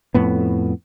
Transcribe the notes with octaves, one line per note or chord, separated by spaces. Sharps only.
F2 A2 B3